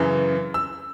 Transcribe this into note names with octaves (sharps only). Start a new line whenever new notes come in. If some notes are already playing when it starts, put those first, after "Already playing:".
Already playing: F#2 C#3 E3
E6